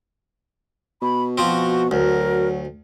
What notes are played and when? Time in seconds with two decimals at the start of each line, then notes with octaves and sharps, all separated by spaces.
1.02 B2 B5
1.38 F3 C4 F#4
1.91 D2 F#3 A#4